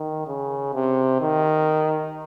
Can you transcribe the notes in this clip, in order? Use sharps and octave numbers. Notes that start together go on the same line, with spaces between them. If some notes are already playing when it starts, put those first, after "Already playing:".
Already playing: D#3
C#3
C3
D#3